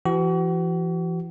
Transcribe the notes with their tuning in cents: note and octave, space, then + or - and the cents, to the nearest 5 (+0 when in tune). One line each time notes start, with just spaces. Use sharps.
E3 +40 F#4 +40